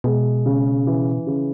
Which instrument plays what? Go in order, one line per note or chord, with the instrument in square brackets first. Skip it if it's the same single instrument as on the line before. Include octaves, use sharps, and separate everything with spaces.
[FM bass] B2 [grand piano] G#3
[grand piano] C#3
E3
C#3